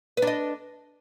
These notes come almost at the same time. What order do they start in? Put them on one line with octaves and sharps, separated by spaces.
B4 D4 D#5